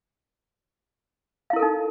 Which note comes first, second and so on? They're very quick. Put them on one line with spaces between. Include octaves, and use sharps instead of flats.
F5 E4 A#4 A4 D#4